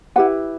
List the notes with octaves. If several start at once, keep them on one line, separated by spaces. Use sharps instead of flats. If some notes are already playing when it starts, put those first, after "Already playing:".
E4 G4 B4 F#5